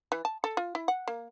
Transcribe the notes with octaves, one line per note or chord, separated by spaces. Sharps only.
E3
A5
A4
F4
E4
F#5
A#3